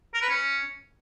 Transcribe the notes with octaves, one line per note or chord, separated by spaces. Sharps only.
A#4
B4
C#4